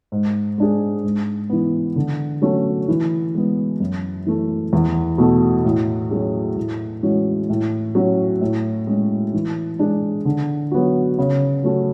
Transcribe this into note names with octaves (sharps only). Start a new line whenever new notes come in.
G#2
G#3 D4 G#4
G#2
E3 B3
D3
F#3 A3 C#4
E3
G#3 B3
F#2
E3 A3
E2
B2 A3
A2
F#3 C#4 G#4
A2
E3 G#3 C#4 F#4
A2
F#3 C#4
A2
G#3 C#4
E3
G#3 D4 G#4
D3
F#3 B3 F#4
C#3
F#3 A3 C#4 F#4